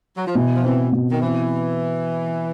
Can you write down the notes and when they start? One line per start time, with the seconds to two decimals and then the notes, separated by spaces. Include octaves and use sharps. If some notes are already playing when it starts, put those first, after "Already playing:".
0.16 F#3
0.26 F3
0.35 B2 E3
0.55 F3
0.64 E3 C4
0.92 B2
1.12 D#3
1.22 E3 C4